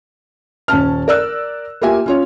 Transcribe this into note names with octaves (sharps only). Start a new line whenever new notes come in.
D#1 C#4 A5 F6
A#4 D5 E6 F#6
A#3 F4 G4 E5 G#5
C#4 F4 C#5